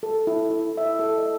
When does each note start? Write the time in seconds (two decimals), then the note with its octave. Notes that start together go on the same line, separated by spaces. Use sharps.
0.03 A4
0.27 E4
0.50 E4
0.77 E5
0.99 A4
1.18 D#5